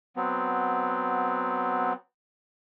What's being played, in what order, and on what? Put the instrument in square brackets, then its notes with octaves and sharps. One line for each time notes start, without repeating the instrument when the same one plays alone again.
[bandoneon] F#3 B3 C4